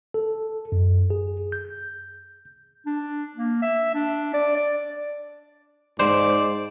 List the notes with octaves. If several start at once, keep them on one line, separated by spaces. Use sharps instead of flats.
A4
F#2
G#4
G6
D4
A#3
E5
D4
D5
D5
G#2 C5 D5